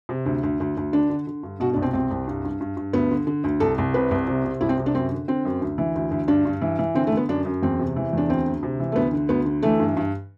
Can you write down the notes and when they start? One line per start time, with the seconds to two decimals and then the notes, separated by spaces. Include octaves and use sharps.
0.09 C3
0.26 D2
0.43 D2
0.60 D2
0.77 D2
0.93 D3 D4
1.10 D3
1.27 D3
1.43 G2
1.60 B2 F#4
1.73 C2 D4
1.82 C4
1.93 C2 C4
2.11 C2
2.27 G2
2.44 G2
2.61 G2
2.77 G2
2.93 D2 B3
3.11 D3
3.27 D3
3.44 D2
3.60 C2 A4
3.78 C2
3.94 C3 B4
4.11 C2
4.27 C3
4.45 C3
4.61 C2 E4
4.69 C4
4.78 C3
4.86 D4
4.95 F#2 C4
5.12 D3
5.28 D3 C4
5.45 F#2
5.61 D2
5.78 E3
5.95 D2
6.11 D2
6.28 G2 D4
6.45 G2
6.61 E3
6.79 E3
6.95 D3 C4
7.07 A3
7.12 D3 B3
7.29 F#2 D4
7.45 F#2
7.62 E2 C4
7.79 C3
7.96 E3
8.13 E2 D4
8.29 D2 C4
8.46 D2
8.63 C3
8.80 E3
8.92 A3
8.96 D2 B3
9.13 D3
9.29 D2 B3
9.46 D3
9.63 E3 A3
9.80 G2
9.97 G2